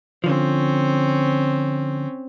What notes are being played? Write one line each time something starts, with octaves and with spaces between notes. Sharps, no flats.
D3 F3 C4 C#4